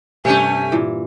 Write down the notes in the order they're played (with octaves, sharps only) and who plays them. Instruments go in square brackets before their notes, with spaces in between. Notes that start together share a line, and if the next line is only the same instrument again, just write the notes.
[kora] G2 C3 [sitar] A3 C#4 [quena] G#5
[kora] A#2 E3